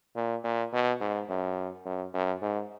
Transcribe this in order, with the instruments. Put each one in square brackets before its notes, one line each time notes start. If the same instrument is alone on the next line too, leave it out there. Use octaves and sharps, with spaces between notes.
[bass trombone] A#2
A#2
B2
G#2
F#2
F#2
F#2
G#2